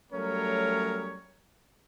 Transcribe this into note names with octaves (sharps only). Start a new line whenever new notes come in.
F#3 G3 A3 C#4 A#4 C#5